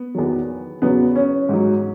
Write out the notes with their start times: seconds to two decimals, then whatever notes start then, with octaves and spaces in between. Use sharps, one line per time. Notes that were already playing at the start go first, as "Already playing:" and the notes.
Already playing: B3
0.15 E2 D#3 F#3
0.82 E2 C#3 F#3 B3
1.16 C#4
1.49 G#2 F#3